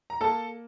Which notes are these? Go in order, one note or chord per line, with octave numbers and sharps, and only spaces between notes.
A#5
A#3 A4 A5